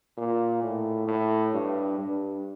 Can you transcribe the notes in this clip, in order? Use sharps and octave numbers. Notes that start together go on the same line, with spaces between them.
A#2
A2
A2
G2
G2